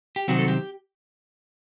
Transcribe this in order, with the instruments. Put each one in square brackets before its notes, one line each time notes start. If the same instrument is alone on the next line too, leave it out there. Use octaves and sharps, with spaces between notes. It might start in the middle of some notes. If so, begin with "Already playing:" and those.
[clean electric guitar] G4
C2 C3 D#3 F#3 C4 F#4
A4
G4